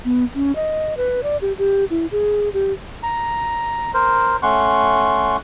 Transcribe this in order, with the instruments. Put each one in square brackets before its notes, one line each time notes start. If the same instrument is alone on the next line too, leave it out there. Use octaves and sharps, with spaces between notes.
[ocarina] B3
C#4
D#5
B4
D5
G4
G4
E4
G#4
G4
[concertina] A#5
A#4 C5
A3 C#4 F#5 C6 C#6